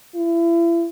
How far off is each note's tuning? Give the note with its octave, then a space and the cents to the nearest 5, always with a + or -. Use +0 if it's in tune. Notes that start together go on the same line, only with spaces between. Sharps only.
E4 +35